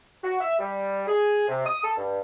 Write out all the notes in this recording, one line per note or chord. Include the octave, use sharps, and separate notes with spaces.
F#4
E5
G3
G#4
C3
D#6
A4
G2